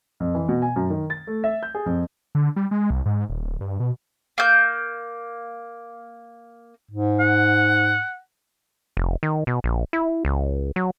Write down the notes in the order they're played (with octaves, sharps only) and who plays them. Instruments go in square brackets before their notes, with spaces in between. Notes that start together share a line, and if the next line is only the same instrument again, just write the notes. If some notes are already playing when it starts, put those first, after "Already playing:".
[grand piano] F2
E3
B2
G#5
F#2
D#3
A6
A3
E5
G6
G#4
F2
[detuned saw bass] D3
G3
G#3
C2
G#2
D#1
D1
G2
B2
[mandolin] A#3 G6
[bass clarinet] G#2
[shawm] F#5
[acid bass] F1
D#3
B2
A#1
E4
C#2
F#3